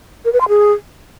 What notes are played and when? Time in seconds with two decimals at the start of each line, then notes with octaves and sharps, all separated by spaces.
0.25 A#4
0.33 B4
0.41 C6
0.49 G#4